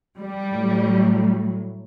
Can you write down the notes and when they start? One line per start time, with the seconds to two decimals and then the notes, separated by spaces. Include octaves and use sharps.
0.18 G3
0.50 A2 F#3